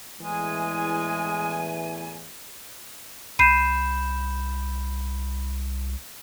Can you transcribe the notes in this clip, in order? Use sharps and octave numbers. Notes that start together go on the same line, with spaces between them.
E2 A2 E3 G#3 G#5
C2 B5 G6 C7 D#7 E7